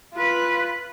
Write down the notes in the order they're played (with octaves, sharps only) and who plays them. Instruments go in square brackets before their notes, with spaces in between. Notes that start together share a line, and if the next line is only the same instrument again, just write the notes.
[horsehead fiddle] F4 B4